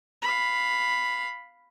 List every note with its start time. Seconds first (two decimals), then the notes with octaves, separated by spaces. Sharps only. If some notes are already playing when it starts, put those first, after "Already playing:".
0.22 F5 B5